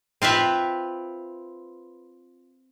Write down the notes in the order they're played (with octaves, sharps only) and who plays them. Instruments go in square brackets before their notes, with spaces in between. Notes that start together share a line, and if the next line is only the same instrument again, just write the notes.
[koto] C4 F4 B4 E5